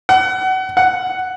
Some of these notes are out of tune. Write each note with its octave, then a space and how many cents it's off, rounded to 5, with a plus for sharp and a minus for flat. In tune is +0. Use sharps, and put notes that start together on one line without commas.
F#5 +30
F#5 +5